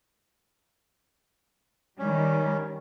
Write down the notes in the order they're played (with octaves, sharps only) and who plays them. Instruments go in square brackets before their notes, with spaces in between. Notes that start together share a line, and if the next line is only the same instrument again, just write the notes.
[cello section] D#3 G3 [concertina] C#4